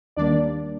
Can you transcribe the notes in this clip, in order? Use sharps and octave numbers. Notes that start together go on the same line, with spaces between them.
D#2 D#3 G3 A#3 D4 D5